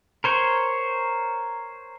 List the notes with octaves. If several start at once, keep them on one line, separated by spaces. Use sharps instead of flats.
A#4 C5 C#5